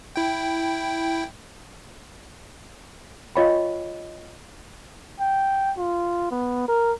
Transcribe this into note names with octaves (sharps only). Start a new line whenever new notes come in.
E4 G5
F4 C#5 D#5 F5 G5 B5
G5
F4
B3
A#4